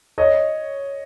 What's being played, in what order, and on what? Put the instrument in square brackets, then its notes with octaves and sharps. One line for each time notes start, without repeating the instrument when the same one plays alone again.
[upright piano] C#5 D#5